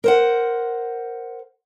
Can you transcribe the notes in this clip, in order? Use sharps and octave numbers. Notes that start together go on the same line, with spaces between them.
A#4 C5 F#5